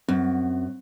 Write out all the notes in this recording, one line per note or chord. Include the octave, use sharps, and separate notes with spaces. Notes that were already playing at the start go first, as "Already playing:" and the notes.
F#2 C4